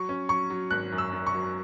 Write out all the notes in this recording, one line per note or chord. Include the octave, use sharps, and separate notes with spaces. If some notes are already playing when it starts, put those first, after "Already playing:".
Already playing: F#3 C#6
C#4
F#3 C#6
F#3
G#1 F#6
F#2
E6
F#2
C#6
F#3